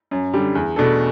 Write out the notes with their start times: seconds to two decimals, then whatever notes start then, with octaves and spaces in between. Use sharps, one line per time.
0.11 F#2
0.33 D3 G3
0.55 E2
0.76 B2 A3 D4 A4